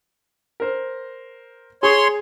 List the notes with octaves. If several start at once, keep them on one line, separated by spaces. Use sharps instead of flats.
A#4 C5
G#4 C#5 C6